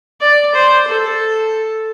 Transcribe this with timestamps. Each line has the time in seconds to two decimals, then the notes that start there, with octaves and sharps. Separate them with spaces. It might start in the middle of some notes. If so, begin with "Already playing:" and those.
0.21 D5
0.54 C5
0.88 A4